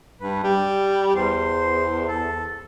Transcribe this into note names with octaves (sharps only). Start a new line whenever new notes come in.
G2 B4
G3 G5
E2 C5
A4